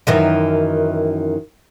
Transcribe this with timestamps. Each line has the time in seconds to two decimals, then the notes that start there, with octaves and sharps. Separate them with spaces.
0.07 F#2 D#3 E3